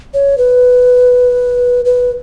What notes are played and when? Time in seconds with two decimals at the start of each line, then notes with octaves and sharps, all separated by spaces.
0.14 C#5
0.38 B4
1.85 B4